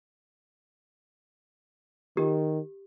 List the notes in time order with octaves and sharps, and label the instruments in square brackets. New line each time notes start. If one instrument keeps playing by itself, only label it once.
[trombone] D#3 [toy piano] G4